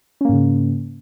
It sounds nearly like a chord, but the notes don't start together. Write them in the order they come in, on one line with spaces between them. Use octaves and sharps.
C#4 A#3 G#2 C#3